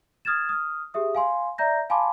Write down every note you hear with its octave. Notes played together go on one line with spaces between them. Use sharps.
D#6 F6 G#6 A6 E7
D#6 F6
G4 G#4 E5 D#6
F5 G#5 C6
D5 E5 A#5 G6 A#6
F5 G#5 A5 B5 C6 D6